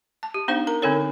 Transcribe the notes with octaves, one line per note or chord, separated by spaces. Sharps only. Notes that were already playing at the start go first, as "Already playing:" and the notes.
A5
G4
B3 D4 D#4 C5 F5
A#4 A#5
D3 C4 D#4 A4 A#4 C#5